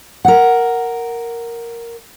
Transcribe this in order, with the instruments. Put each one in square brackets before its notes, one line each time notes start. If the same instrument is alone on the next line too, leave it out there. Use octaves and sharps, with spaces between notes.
[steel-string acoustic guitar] A#4 F#5